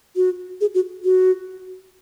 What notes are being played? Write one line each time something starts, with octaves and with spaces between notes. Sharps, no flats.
F#4
G#4
F#4
F#4